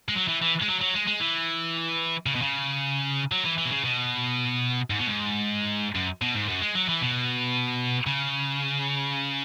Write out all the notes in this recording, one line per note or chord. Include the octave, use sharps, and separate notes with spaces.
G#3
F#3
E3
E3
G#3
F#3
F#3
G#3
G#3
E3
C#3
B2
C#3
F#3
E3
E3
B2
C#3
B2
G#2
B2
G#2
F#2
B2
G#2
F#2
G#3
F#3
E3
B2
C#3